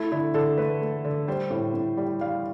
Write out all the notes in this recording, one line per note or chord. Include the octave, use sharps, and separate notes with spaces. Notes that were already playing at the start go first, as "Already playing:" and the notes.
Already playing: A3 E4
D3 E4
D3 A4
A3 B4
A3
D3
G3 C5
A2
A2
G3
G3 F5